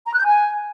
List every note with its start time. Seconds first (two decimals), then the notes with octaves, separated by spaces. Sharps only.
0.06 A#5
0.12 F#6
0.19 G6
0.25 G#5